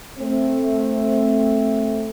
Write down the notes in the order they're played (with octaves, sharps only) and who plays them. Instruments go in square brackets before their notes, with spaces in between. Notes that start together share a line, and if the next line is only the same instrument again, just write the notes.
[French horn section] A3 C4